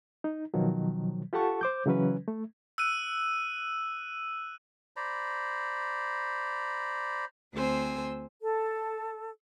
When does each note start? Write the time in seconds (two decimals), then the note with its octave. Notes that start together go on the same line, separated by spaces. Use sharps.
0.24 D#4
0.54 B2 D#3 F3 F#3
1.33 F4 G4 A4 F#5 A5 C#6
1.61 C5 D6 G6
1.86 C#3 E3 F#3 C#4 B4
2.28 A3
2.78 E6 F#6 D#7
4.96 C5 D5 A#5 B5
7.53 D2 C4 C5 G#5 E6
8.42 A4